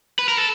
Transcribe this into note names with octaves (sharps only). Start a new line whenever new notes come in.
B4
A#4
A4